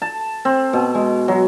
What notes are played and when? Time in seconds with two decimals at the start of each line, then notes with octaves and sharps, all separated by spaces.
0.02 A5
0.45 C4
0.73 B2
0.95 G#3
1.28 F#3